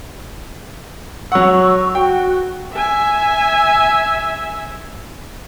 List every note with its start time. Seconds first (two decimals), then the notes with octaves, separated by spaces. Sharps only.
1.32 F#3 F#5 C#6 E6
1.95 F#4 G5
2.74 E5 G#5